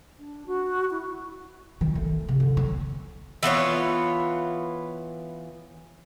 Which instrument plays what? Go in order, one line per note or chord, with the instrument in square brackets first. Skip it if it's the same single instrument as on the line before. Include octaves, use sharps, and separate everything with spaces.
[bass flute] D4
F#4
E4
[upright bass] D#3
A3
C#3
D3
C#4
[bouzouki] E3 B3 F4 C#5